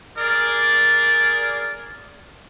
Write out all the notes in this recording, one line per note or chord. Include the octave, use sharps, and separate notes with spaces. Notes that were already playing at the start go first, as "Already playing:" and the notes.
G#4 A#4 D5